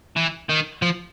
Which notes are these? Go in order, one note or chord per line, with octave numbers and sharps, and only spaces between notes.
E3
D#3
F3